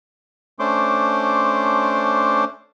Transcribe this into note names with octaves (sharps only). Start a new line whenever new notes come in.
A3 C#4 D4 C5 C6 D6